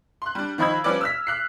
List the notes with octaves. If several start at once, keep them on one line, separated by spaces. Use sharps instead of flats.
C6 F#6
G3 D4
D#3 F3 D#5 B5 E6 G#6
F3 G3 C#4 B4 D5
E6 F6 B6
F6 F#6 C7